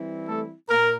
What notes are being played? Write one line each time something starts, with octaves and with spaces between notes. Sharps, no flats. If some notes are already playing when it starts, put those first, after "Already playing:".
Already playing: E3 G3 C4 E4
A3 A4
A#2 A#3 A#4